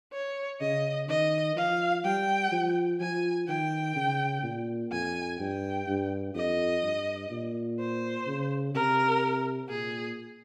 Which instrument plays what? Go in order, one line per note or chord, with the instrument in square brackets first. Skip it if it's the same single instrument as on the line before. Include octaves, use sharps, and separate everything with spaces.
[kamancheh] C#5
[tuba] C#3 [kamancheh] D#5
[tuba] D#3 [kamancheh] D#5
[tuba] F3 [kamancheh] F5
[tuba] G3 [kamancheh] G5
[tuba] F3
[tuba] F3 [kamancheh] G#5
[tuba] D#3 [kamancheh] G5
[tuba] C#3
A#2
[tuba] F2 [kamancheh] G#5
[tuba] G2 [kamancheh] G5
[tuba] G2
[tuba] F2 [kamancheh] D#5
[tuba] G2
A#2
[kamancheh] C5
[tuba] C#3
[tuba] C3 [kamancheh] A#4
[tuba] A#2 [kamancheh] G#4